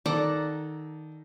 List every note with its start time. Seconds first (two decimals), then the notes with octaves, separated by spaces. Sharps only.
0.06 D#3 A4 D5 F#5 A#5